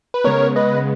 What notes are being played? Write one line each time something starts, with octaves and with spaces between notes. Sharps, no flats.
B4
C#3 G#3 B3 A#4 C#5
B4 D#5